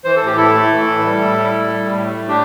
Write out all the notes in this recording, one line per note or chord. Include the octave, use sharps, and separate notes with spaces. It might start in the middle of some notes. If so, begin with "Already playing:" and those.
E3 C5
A4
A2
G4
A2 E4 A4
A3
E3
A2
G3
A2
G3
A2
G3
A2
A3
A2
D4 G4